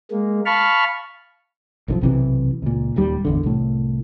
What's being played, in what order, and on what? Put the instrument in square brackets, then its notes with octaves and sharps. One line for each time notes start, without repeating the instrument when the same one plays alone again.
[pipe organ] G#3 A#3
F5 A5 B5 C#6 F6
[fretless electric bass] B1 D3 F3
B1 C3 E3
C#2 A#2
D#1 D#2 G3
A1 E2 D3
C2 A2